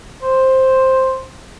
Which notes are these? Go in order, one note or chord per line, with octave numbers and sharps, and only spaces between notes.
C5